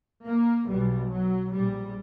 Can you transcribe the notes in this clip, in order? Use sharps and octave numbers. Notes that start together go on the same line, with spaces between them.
A#3
B1 B2 G3
F#3
A#1 A#2 G3